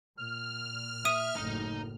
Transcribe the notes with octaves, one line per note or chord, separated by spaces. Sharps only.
A#2 F6
E5 D#6 D#7
F#1 A2 D#4